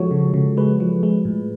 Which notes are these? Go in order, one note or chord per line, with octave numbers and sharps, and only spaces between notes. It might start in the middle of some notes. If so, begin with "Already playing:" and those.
Already playing: F3 G#3 F#4 A4 C#5
C#3
C#3
G#3 B4
F3
G#3
A2